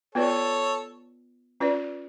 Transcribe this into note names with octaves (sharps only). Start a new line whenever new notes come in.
B3 F4 A4 B4 C#5 D5
C#4 F4 B4 D5